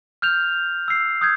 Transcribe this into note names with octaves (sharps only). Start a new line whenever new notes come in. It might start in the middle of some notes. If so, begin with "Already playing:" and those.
F6 G6 F7
E6 C7
D#6 G6 G#6